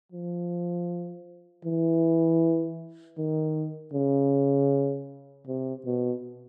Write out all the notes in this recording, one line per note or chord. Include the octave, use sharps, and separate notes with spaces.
F3
E3
D#3
C#3
C3
B2